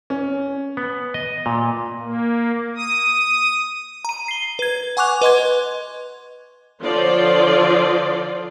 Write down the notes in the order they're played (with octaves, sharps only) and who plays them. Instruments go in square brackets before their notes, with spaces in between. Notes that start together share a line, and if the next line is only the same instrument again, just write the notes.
[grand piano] C#4
[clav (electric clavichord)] B3
D#5
A#2
[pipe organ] A#3
D#6
[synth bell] A#5 D#7
C7 G7
B4 G#6
F#5 G#5 C#6 D6 F#6 F7
B4 D#5 C6 G#6
[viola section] D3 F3 F4 C#5 D5 C6